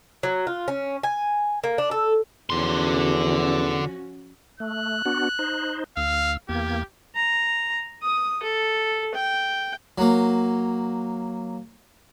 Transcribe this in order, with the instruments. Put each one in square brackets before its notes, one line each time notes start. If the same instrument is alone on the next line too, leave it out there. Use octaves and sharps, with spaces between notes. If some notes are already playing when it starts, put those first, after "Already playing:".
[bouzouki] F#3
F4
C#4
G#5
A#3
D4
A4
[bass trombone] E2 [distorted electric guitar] D3 C6 [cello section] F3 C#4 F#4
[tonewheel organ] A3 [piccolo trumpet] F#6
[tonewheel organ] B3 D4 F#4
D#4 C5
[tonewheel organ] D2 E6 [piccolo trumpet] F5
[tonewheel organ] E2 A#3 G#6 [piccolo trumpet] G4
[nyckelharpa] A#5
D#6
A4
G5
[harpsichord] F#3 A#3